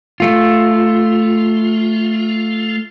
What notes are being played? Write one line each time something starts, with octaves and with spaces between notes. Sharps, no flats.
A3 F4